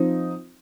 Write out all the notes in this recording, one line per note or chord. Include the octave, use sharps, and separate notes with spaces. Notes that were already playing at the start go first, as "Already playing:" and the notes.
Already playing: F3 C4 D#4